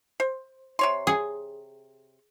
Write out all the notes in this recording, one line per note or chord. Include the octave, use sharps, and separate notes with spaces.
C5
C3 C#5 C6
G#4